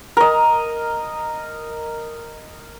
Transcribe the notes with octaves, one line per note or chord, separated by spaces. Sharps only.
A#4 D#5